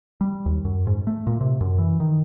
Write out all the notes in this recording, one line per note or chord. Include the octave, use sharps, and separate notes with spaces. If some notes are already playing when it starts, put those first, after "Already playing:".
G3
D#2
F#2
G#2
A3
A#2
C3
F#2
E3
D#3